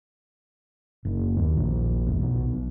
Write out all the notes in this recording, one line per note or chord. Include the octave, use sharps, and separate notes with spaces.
F#1
D#2
A#1
E1
B1